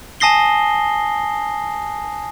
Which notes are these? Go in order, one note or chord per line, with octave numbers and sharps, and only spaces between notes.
G#5 A5 D#6 A#6 C7 G7